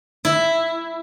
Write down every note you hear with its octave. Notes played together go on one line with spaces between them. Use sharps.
E4